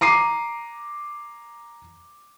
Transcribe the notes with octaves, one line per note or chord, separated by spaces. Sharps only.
A#5 D6 C7 D#7